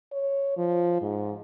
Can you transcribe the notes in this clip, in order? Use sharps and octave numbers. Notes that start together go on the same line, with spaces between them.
C#5
F3
G#2